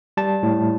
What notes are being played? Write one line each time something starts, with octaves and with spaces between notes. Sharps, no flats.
G3 A5
A2